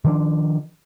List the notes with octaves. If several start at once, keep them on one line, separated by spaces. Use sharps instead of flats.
D#3 F3 A#3 D4